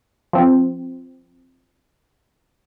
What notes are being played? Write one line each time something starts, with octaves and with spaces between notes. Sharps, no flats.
F3 C4